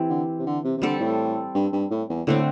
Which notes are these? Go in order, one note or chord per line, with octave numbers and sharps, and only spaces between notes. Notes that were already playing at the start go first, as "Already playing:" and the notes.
Already playing: E3 C4 G4
D3
C3
D3
C3
C3
D3 G3 C4 A4
A2
G2
G2
A2
E2
A2 D3 A3 C4